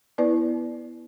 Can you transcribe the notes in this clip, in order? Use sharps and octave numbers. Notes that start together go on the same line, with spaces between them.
B3 E4 B4 D5